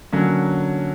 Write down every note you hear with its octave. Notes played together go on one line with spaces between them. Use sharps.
D3 F#3 A#3 C#4